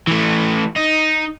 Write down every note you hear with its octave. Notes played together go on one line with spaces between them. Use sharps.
E3 A3
D#4